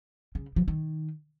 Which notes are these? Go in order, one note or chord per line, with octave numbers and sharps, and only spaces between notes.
C#3
F3
D#3